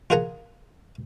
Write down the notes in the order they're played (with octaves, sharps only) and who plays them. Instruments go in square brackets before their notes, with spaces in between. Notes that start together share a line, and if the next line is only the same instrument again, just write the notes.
[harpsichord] F4 G#4 A#4 F#5 G#5 A#5